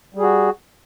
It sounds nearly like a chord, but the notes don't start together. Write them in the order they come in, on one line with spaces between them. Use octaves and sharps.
G3 G#4 F#4